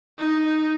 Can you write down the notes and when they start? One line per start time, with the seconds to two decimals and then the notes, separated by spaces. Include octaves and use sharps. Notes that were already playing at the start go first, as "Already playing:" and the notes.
0.19 D#4